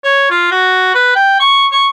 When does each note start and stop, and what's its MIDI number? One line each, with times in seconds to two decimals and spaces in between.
0.04 0.26 73
0.31 0.47 65
0.51 0.94 66
0.95 1.13 71
1.15 1.35 79
1.40 1.67 85
1.72 1.88 85